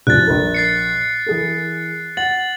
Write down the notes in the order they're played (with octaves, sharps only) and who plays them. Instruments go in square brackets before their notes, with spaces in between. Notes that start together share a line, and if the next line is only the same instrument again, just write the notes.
[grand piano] D#1 F3 C4 [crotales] F#6 A6
[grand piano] A#1 A#4
[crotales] A6 C7 C#7
[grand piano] E3 G#4 A#4
[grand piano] F#5 [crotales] A6 F#7